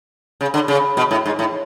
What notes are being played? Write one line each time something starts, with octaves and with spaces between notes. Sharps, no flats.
C#3
D3
C#3
B2
A2
G#2
A2